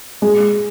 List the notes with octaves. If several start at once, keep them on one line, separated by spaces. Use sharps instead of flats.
G#3